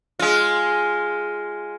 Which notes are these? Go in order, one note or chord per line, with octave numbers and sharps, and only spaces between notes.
G#3 F4